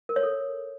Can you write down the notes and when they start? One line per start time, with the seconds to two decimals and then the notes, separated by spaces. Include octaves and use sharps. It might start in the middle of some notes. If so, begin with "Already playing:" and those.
0.09 A#4
0.16 C#5
0.23 A4